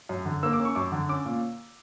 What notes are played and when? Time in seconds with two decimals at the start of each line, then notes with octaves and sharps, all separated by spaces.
0.09 F#2
0.25 D3
0.43 A#3 E6
0.53 D6
0.59 C#4
0.65 C#6
0.75 F#2 D6
0.92 D3
1.09 C#4 D6
1.25 A#2